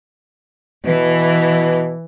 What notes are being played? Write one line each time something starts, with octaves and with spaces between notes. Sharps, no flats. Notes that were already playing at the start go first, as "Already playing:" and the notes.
B2 E3